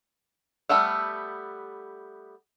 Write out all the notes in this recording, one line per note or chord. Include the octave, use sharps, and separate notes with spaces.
G3 A3 B3 E5